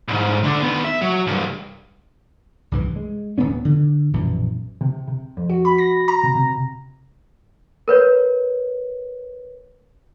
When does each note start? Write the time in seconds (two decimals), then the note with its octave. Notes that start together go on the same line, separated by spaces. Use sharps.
0.08 C2 G#2
0.43 D2 D3
0.62 D#3 B3
0.84 E5
1.02 F#3
1.27 C2 G2
2.71 C2 G2 E3
2.96 G#3
3.38 D1 F#2 B3 C#4
3.65 D3
4.14 A#1 F#2 B2 E3
4.81 C3
5.08 C3
5.37 F2
5.50 F#4
5.65 B5
5.78 A#6
6.08 A#5
6.24 C3
6.35 C3
7.88 A#4 B4 C#5